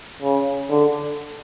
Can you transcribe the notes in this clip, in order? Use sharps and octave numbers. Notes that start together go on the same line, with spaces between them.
C#3
D3